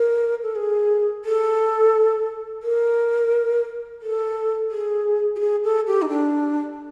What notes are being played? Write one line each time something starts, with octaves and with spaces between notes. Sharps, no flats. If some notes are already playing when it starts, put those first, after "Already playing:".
Already playing: A#4
A4
G#4
A4
A#4
A4
G#4
G4
G#4
A4
G4
D#4
D4